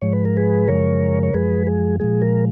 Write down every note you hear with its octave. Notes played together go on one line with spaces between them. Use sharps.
G#2 F3 G#3 C#5
B4
A#4
G#4 B4
F#2 C#3 F3 G#3 A#4 C#5
C#5
F#2 F3 G#3 G#4 B4
G#4
A#2 F3 G#3 G#4
A#4